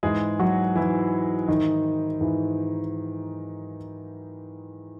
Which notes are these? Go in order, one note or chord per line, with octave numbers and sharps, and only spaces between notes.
G#2 E3 G#3 G#4
F#3 F#4
G#2 E3 E4
G#2 D#3 E3 D#4
G#2 E3